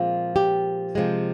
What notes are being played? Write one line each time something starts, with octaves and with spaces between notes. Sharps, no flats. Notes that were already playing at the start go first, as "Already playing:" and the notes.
Already playing: A#2 F3 G#3 C4 F4
G4
C3 F3 G#3